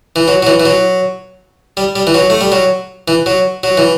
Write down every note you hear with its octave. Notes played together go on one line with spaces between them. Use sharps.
E3
F#3
F#3
E3
E3
F#3
G3
G3
E3
F#3
A3
G3
F#3
E3
F#3
F#3
E3